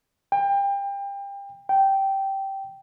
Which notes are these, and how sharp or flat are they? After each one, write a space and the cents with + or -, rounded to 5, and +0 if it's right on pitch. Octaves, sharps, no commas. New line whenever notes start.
G5 +30
G5 -10